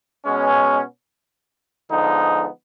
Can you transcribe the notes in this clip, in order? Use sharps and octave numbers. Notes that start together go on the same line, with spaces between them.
B2 G#3 B3 C#4
D3 F3 G#3 B3 D#4